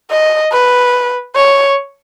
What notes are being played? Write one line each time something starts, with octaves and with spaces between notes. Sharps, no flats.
D#5
B4
C#5